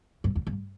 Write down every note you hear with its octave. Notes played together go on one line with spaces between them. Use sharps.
G2
E2
G2